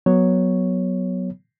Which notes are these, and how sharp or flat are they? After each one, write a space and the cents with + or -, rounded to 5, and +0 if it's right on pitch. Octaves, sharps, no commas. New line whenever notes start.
F#3 +0 B3 +0 C#5 +0